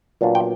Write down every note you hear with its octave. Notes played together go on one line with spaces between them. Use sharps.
A#2 F#3 B3 D4 F4
G5